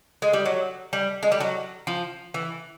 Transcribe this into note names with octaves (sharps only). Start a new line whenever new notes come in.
G#3
G3
F#3
G3
G#3
G3
F#3
F3
E3